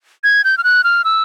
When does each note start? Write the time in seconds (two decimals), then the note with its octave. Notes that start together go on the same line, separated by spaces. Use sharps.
0.24 G#6
0.44 G6
0.58 F6
0.64 F#6
0.84 F6
1.04 E6